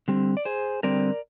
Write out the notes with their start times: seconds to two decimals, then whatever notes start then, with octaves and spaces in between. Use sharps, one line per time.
0.08 D3 G3 C4
0.37 D5
0.45 G#4 C5
0.83 D3 G3 C4 A#4 D5